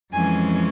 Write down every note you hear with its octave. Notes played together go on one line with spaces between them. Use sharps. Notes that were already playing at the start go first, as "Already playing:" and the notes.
F2 E3 G#3 C#4 G#5